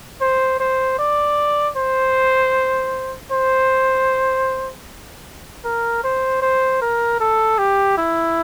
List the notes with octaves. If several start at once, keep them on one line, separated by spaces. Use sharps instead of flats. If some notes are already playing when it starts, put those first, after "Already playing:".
C5
C5
D5
C5
C5
A#4
C5
C5
A#4
A4
G4
E4